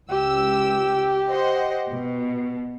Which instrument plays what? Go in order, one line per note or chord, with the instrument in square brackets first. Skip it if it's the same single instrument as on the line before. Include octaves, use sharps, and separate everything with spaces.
[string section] C#2 E6 [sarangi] G4
[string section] C5 D#5 F#5
B2